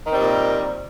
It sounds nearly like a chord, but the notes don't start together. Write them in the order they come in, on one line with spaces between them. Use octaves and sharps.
D#3 C4 G3 A#2